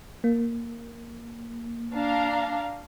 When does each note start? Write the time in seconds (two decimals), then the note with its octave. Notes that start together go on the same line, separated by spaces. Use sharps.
0.24 A#3
1.95 D4 F5 A#5